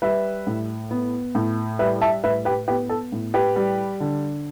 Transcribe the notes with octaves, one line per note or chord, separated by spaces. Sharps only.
G3 B4 E5
A2
B3
A2
G3 B4 E5
E5 A5
A2 B4 E5
G4 B4
B3 G4 B4
A4
A2
G4 B4
G3
D3